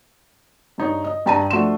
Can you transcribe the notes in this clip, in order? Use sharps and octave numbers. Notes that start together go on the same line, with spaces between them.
G2 D#4 C#5
D#5
G2 G5 A5 A#5 D#7
F3 A3 D4 F#4 C6 E7